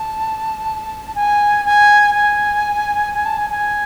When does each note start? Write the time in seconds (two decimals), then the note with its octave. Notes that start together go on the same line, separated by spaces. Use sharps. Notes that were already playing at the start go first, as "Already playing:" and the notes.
Already playing: A5
1.15 G#5
1.65 G#5
2.15 G#5
3.14 G#5
3.25 A5
3.38 G#5
3.50 G#5